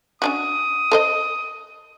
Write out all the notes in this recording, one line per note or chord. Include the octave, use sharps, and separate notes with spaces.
C#4 D4 F#4 D#6
A4 C5 D#5